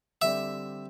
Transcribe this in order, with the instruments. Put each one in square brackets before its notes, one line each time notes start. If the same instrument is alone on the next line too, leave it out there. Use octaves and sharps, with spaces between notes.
[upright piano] D3 G3 C4 G4 D5 [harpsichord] E5